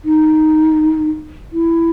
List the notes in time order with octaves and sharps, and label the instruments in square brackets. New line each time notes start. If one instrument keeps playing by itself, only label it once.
[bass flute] D#4
E4